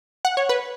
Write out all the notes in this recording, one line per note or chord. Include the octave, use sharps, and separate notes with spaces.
F#5
C#5
B4